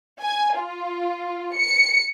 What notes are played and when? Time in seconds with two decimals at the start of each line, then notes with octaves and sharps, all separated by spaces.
0.22 G#5
0.59 F4
1.56 C#7